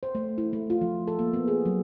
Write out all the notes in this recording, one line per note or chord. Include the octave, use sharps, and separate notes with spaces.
C5
A3
E4
A3
F4
F3
A4
A#3
B3
G#4
F#3